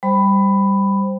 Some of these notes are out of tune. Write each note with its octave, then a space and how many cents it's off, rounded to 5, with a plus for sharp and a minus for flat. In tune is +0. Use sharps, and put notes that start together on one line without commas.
G3 +0 C5 +0 B5 +10